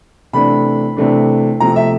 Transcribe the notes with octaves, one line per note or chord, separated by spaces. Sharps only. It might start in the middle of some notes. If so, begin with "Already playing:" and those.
C3 E3 A3 D4 B5
C3 E3 A3 D4
C3 F3 A3 C4 A#5
E5